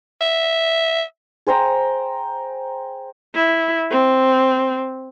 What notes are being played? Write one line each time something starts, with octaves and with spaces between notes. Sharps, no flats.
E5
G#4 C5 G5 A#5
E4
C4